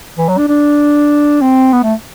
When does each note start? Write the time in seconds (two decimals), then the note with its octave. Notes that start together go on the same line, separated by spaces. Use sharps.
0.18 E3
0.28 F#3
0.38 D4
0.48 D4
1.42 C4
1.73 B3
1.83 A3